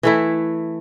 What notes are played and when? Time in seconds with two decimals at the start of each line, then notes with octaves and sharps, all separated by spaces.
0.03 E3 A3 E4